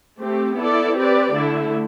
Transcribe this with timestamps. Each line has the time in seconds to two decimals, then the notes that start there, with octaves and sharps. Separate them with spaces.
0.19 A3 C4 G4
0.58 B3 E4 A4 D5
0.96 C4 G4 B4 D5
1.34 D3 A3 E4